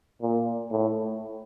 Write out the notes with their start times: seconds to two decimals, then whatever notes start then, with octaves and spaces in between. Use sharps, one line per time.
0.21 A#2
0.71 A2